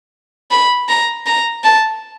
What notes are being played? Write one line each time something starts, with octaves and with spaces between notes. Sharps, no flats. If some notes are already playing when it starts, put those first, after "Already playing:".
B5
A#5
A#5
A5